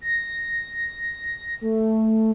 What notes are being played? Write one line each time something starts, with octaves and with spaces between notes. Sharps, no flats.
A#6
A3